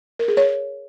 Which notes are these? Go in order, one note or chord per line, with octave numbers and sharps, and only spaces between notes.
A#4
G#4
C#5